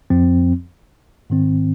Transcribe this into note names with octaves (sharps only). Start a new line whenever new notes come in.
F2 F3 C4
G#2 D#3 C4